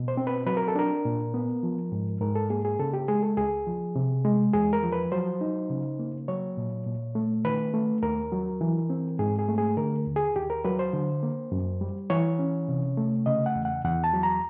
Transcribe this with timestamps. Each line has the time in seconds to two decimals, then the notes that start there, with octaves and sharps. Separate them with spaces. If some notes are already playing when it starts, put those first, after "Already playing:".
Already playing: B2
0.08 C5
0.17 C4
0.27 B4
0.47 F#3 B4
0.57 A#4
0.68 A4
0.75 D4 A#4
1.05 A#2
1.34 B3
1.63 F3
1.92 G#2
2.21 G#2 A#4
2.35 A4
2.50 A#3 G#4
2.65 G#4
2.79 C#3 A4
2.93 G4
3.08 G#3 G#4
3.23 A4
3.37 C#2 G#4
3.67 F3
3.96 C3
4.25 G#3
4.54 E2 G#4
4.73 A#4
4.83 F3
4.92 B4
5.12 F#3 C5
5.41 D#4
5.70 C#3
5.99 A#3
6.28 F#3 C#5
6.57 A#2
6.86 A#2
7.15 A3
7.44 D#3 B4
7.74 A3
8.03 D#2 A#4
8.32 F#3
8.61 E3
8.90 C4
9.19 G#2 G#4
9.39 G#4
9.48 A3
9.58 G#4
9.77 D3 A#4
10.07 D#2
10.16 G#4
10.35 D#2 G4
10.50 A#4
10.64 F#3 B4
10.79 C5
10.93 D3
11.23 A#3
11.52 F#2
11.81 G3
12.10 E3 C#5
12.39 C#4
12.68 C3
12.97 A3
13.26 C#3 D#5
13.46 F#5
13.55 E2
13.65 F#5
13.84 E2 F#5
14.04 A5
14.13 F#3
14.23 A#5